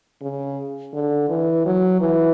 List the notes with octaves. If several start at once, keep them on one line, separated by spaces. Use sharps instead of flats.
C#3
D3
E3
F#3
E3